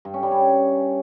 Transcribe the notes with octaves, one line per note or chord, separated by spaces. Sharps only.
G2
C#4
G3
C#4